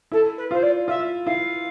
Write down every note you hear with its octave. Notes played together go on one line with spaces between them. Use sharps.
E4 A4
B4
F4 C5
D5
F4 E5
E4 F5